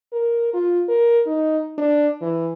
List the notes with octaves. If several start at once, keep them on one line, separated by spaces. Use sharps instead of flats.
A#4
F4
A#4
D#4
D4
E3